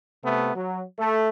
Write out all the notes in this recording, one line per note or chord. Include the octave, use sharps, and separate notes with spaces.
C3 A3 B3
F#3
A3